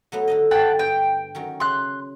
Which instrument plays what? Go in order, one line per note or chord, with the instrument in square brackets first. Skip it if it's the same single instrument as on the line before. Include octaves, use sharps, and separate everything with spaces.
[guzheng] F#3 A3 B3
D3 D#4 D#5
[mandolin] F#5 G5 A5
[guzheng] G2 [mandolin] G5
[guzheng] D#3 F#3 C#4
[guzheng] C#3 [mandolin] C6 F#6